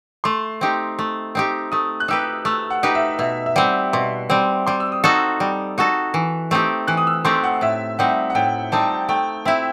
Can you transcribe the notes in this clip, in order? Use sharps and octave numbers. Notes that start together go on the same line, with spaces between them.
A3 C6
C4 D#4 G4
A3
C4 D#4 G4
A3 D#6
F#6
D#4 G4 B4 E6
A3 E6
F#5
D#4 G4 B4
E5
B2 E5
E5
G3 C4 F#5
B2 C6
G3 C4
G3 C6
E6
D#6
D#4 F#4 A4
E6
G3
D#4 F#4 A4
E3
A3 C4 D#4 G4
E3 F#6
D#6
E6
A3 C4 D#4 G4 C6
F#5
A2 E5
G3 C4 D#4 F#5
F#5
A2 G5
G3 C4 D#4 A5
A3 G5
C4 E4 E5